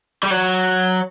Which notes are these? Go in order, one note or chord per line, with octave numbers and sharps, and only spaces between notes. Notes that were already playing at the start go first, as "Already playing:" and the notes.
G3
F#3